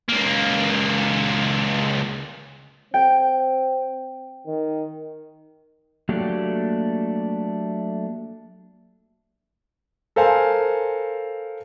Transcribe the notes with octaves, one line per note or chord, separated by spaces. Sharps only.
C#2 A#3
C4 G5
D#3
F#3 A3 A#3 D4 F#4 G4
A4 A#4 C5 F5 G#5